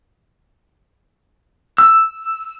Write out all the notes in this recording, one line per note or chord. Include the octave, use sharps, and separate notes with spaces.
E6